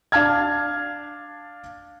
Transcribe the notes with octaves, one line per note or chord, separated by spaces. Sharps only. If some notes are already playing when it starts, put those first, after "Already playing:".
D4 F5 A5 F6 G#6